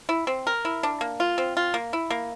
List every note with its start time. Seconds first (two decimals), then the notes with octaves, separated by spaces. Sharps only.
0.09 E4
0.27 C4
0.47 A#4
0.65 E4
0.83 D4
1.01 A#3
1.20 F4
1.38 C4
1.57 F4
1.74 A#3
1.93 E4
2.11 A#3